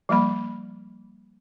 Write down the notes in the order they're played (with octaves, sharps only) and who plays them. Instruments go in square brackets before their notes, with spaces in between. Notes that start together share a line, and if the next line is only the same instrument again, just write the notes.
[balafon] F3 G3 A#3 B5